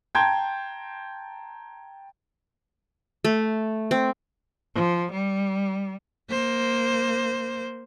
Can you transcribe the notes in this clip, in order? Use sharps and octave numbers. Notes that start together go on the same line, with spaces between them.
G5 A5 A#5 C6 G6 G#6
A3
C4
F3
G3
A#3 C5